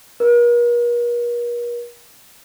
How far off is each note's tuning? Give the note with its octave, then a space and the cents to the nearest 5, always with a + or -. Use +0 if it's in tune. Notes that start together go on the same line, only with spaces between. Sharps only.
A#4 +45